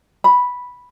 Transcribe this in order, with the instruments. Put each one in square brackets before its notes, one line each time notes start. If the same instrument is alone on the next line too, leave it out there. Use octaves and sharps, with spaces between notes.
[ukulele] B5